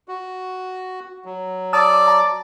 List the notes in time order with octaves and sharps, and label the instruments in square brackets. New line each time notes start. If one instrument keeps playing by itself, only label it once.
[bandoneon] F#4
F#3
[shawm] D5 [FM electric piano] A5 D#6 E6
[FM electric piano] A5 A#5